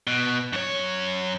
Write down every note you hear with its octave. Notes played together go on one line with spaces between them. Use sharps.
B2
F#2 C#5